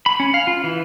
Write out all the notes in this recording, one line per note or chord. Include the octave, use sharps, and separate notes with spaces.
B5
C#4
F5
F4
E3